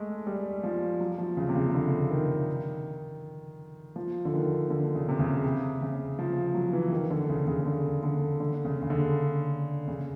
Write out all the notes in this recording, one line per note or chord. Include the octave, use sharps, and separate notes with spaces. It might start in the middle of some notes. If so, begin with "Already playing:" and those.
Already playing: G#3 A3
G3
F3
F#3
F3
C#3
C3
C#3
D3
D#3
F3
D3
D#3
D3
C#3
C3
C#3
C3
C#3
F3
F#3
E3
D#3
D3
C#3
C#3
D3
D3
D3
C#3
C#3
D3
C#3